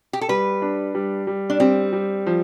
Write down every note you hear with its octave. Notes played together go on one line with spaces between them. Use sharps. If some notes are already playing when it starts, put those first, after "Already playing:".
G4
A4
G3 B4
D4
G3
G3
D4
G3 C4
G3
F3